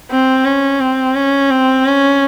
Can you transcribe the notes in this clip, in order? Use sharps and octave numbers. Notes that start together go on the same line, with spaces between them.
C4
C#4
C4
C#4
C4
C#4